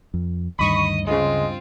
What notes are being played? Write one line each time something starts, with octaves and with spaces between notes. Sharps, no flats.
F2
D2 G2 D#3 D#5 B5 C#6 D#6
D2 G2 C#3 G#3 C4 F4